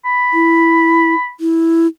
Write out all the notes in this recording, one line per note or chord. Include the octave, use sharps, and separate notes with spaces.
B5
E4
E4